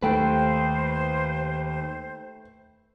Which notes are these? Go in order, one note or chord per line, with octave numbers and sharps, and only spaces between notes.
D#2 A3 B4 C5 G5